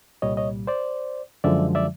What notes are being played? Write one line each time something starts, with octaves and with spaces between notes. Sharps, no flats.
C2 A#2 G3 C#5 D#5
C#5 D#5
C5 D5
F#2 D3 F3 G#3 D5 E5
D5 E5